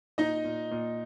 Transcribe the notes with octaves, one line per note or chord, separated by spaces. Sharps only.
A#2 D#4 D#5
A#2
A#2